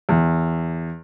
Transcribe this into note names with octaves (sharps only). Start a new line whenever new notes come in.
E2